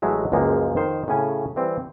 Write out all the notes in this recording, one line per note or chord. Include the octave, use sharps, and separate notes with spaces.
A1 F#3 G#3 A3 E5
C#2 F#2 F3 G#3 A#3
F2 D#3 C5
A2 C#3 C#4 G#5
E3 G3 C4